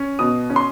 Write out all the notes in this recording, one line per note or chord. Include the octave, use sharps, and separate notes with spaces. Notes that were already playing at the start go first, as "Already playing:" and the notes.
Already playing: C#4
B2 D#6
C#4
C6